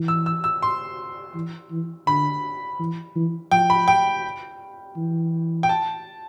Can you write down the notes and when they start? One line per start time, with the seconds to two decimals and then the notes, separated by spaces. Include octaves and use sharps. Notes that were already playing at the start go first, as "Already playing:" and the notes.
Already playing: E3
0.08 E6
0.26 E6
0.44 E6
0.62 C6
1.35 E3
1.71 E3
2.07 D3 B5
2.80 E3
3.16 E3
3.51 F3 G5
3.70 B5
3.88 G5
4.97 E3
5.63 G5
5.69 A5